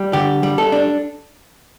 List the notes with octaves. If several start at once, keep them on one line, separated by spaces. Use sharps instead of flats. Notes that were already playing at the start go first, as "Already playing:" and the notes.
Already playing: G3
D3 G4
G3
A4
D4